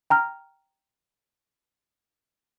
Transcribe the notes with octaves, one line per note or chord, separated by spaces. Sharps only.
G5 A#5 F6